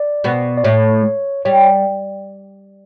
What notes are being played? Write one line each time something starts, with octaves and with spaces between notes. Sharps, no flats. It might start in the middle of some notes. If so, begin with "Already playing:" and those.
Already playing: D5
B2 B3
D5
A2 A3 C#5
G3 C#5